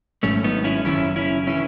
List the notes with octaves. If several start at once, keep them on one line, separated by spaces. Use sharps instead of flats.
G#1 G#2 D#3 F#3 A3 C#4
B3 D#4
C#4 E4
F#1 F#2 D#3 C#4 E4
C#4 E4
C#3 E3 C#4 E4